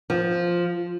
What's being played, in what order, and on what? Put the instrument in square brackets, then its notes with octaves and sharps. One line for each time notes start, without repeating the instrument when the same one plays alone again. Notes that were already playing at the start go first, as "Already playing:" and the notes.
[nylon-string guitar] F3